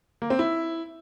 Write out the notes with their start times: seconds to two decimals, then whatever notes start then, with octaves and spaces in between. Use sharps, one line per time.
0.22 A#3
0.30 C4
0.39 E4